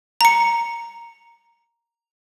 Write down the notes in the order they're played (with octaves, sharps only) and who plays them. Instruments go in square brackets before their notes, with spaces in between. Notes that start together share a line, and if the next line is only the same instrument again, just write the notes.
[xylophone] A#5 C#7